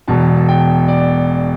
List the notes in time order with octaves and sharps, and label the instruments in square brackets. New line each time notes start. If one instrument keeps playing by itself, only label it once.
[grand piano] E1 E2 B2 A5
A5
G5
D5